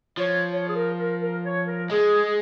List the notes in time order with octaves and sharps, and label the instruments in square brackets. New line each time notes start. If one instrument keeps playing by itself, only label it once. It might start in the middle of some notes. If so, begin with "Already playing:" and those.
[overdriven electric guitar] F3 [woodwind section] C#5
[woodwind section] C#5
G#4
A#4
A#4
A#4
C#5
A#4
[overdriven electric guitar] G#3 [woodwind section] G#4